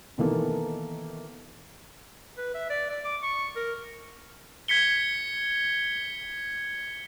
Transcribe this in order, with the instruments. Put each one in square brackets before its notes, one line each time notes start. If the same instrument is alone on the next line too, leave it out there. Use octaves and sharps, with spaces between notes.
[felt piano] B2 D#3 E3 A#3 A4
[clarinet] B4
E5
D5
D5
D6
C#6
A#4
[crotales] G#6 B6 C#7 G7